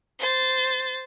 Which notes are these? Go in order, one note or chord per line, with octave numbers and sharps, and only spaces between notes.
C5 A6